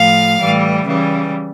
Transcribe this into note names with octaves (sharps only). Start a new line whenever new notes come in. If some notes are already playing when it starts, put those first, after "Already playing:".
Already playing: A2 F3 F5
A2 E3 G3
C#3 E3 G3